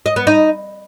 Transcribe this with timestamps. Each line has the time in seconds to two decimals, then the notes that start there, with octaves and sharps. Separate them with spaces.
0.06 D#5
0.16 B3
0.27 D#4